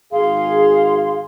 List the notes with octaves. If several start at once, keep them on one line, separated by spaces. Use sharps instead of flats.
G#1 G#4 F5 C6